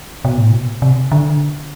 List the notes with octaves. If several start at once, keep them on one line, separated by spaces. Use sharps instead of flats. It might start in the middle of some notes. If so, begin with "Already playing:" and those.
B2
A2
B2
C3
D3